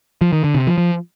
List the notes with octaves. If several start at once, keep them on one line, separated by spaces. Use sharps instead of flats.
F3
D#3
D3
C3
F3
F3